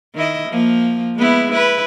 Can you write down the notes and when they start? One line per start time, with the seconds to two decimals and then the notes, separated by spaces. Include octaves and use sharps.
0.15 D#3 E4 D#5
0.48 F3 A#3
1.16 G#3 B3 E4
1.52 E4 B4